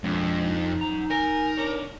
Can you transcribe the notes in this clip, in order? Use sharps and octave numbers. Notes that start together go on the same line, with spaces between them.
F2 G#3 D4
D#4
F#2 A#5
A#4 G#5
D4 C#5